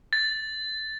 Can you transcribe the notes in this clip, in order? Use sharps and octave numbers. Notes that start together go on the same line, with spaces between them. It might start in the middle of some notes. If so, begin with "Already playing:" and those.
A6